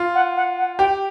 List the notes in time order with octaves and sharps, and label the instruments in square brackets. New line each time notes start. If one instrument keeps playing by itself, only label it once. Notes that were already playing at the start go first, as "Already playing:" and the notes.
Already playing: [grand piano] F4
[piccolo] F#5
F#5
F#5
[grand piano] G4 [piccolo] G5